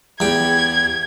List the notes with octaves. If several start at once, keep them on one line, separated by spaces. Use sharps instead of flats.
E2 G4 G#6